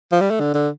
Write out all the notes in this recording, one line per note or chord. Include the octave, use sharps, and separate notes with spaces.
F3
G3
A3
D3
D3